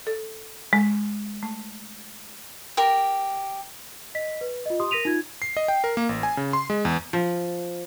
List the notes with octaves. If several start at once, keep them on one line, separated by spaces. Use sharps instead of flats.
A4
G#3
A3
G4 A#4
D#5 B6
B4
F4 D#5
G4 C6 D#6
A#4 A#6 B6 D#7 F7
D#4 F4 G#6
C7
D#5
G5
A#4
A#3
A1
G#5
C#3
C6
G#3
E2
F3